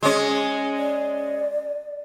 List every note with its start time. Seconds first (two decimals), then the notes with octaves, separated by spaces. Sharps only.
0.03 G#3 C#4 G#4
0.77 D5